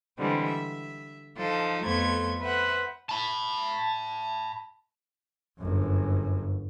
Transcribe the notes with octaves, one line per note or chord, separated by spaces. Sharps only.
D3 E3 G3 G#3 C4
E5
F3 D#4 A4
F2 A3 B3 C5 C6 G#6
B4 C5 E5 F#5
A5 B5
G1 F#2